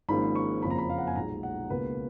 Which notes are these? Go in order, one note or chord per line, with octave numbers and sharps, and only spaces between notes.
G#1 G#2 F3 A#3 C#4 B5
C#6
F#1 F2 F3 A#3 C#4 B5
A#5
B5
F5
F#5
G#5
B1 A#2 G#3 A#5
F#5
C#2 B2 A#3 C#4 B4